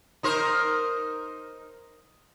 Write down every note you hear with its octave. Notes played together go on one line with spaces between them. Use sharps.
D#4 A#4 C5